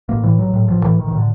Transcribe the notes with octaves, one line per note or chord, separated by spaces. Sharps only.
A1 A#3
A2 E3
A1 F#3
A2
A1 F3
A2 E3
A1 D#3
D#3
A2
D3